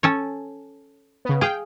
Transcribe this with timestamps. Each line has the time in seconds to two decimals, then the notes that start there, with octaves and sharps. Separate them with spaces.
0.03 C#4 A4 C#5
1.25 C#3 B3
1.41 G#4 F5 G5